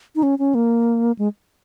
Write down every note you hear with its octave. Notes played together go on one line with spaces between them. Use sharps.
D#4
C#4
C#4
A#3
G#3